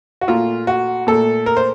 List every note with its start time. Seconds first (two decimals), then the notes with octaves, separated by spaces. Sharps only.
0.21 F#4
0.28 A#2 A3 F4
0.67 F#4
1.07 A#2 A3 A4
1.46 A#4
1.57 C5